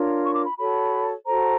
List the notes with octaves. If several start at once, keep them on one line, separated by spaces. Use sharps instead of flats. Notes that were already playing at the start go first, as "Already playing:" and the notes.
Already playing: D4 F4 A#4 C#5
C#6
D6
B5
F#4 A4 C#5 B5
F#4 A4 C5 A#5